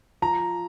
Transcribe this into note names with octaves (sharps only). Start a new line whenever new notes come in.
F3 A#5